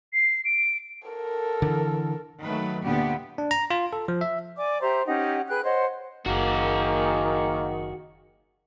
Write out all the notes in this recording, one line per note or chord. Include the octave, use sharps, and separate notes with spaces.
C7
D7
A4 A#4
D3 E3
D#3 F#3 A3 B4
D2 A#2 D3 B3 G4
D4
A#5
F4
A4
F3
E5
D5 G#5 D6
G4 C5 E5 A#5
C#4 D#4 G4 F#5
G#4 B4 G5 F#6
C5 C#5 D#5 F#5
F#1 D#3 A#3 F#4 G#4